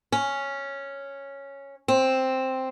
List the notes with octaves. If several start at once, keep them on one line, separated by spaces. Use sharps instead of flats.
C#4
C4